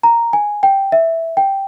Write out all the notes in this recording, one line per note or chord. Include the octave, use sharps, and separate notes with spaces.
A#5
G#5
G5
E5
G5